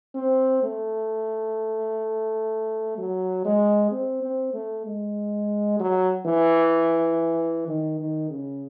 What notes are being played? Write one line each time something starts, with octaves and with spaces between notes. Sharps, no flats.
C4
A3
F#3
G#3
C4
C4
A3
G#3
F#3
E3
D#3
D#3
C#3